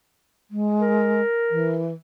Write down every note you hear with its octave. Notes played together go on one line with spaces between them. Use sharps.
G#3
A#4
E3